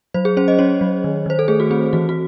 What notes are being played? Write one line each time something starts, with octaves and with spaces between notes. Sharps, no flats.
F#3 C5
G#4
C#4 C5
D#5
C#4 C#5
F#3
D#3
D#3 C5
A4
A3 G#4
F#4
C4 G#4
E3 F#4
F#4